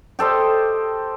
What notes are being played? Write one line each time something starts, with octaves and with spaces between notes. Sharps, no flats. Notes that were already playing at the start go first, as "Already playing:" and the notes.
G4 A4 C5 D#5